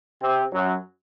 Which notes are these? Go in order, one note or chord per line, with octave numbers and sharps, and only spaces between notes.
C3 C4
F#2 F#3